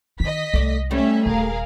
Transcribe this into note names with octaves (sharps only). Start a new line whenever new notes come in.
D#3 D#5 B6
C2 A3 D5 E5
G3 A3 C#4 E5
D#1 G#4 A#4 F5